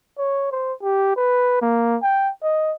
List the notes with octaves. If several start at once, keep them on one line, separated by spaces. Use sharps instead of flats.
C#5
C5
G4
B4
A#3
G5
D#5